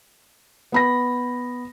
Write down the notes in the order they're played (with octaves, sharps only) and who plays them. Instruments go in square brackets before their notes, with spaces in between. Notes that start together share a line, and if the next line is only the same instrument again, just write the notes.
[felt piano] B3 B5 A#6